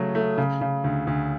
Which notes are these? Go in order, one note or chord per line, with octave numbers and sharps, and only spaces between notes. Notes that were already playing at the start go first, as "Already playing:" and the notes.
Already playing: C#3 F#3 A3
A3
C#3
C#3
D2
D2